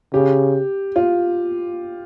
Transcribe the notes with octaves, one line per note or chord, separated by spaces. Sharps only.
C#3 G4
F4